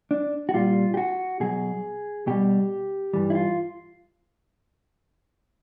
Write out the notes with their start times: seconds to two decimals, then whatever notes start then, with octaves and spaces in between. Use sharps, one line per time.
0.11 D4
0.49 F#4
0.54 A#2 G3 F4
0.94 G4
0.97 F#4
1.40 B2 F#3 G#4
2.27 B2 G3 G4
3.14 G2 E3 G3
3.30 E4
3.35 F4